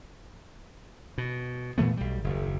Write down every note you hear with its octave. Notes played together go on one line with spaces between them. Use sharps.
B2
A#2 E3 A3 B3
B1 G3
F#1 D#2